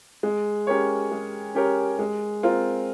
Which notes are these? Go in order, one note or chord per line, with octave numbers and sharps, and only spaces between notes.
G#3
C#4 G4 A#4 C#5
G#3
C#4 G4 A#4 C#5
G#3
C4 F4 A#4